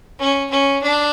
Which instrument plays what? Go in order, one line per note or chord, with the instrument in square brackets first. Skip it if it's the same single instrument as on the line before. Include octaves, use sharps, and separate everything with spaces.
[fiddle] C#4
C#4
D4